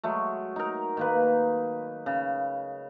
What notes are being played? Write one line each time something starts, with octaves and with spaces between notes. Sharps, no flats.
F#3 G#3 A3
D#4 A#4
D#3 A#3 B4
C#3